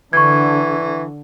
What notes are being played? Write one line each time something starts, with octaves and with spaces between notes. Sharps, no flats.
D3 E3 C#6 G#6